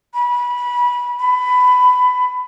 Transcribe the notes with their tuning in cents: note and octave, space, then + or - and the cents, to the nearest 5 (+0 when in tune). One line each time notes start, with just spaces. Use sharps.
B5 -20
B5 +15